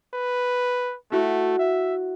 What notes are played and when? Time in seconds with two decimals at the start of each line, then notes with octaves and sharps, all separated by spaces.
0.14 B4
1.12 A3 E4 F#4
1.59 E5